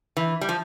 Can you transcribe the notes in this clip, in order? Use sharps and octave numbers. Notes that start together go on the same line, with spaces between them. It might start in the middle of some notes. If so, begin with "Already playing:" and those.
E3
G3
F3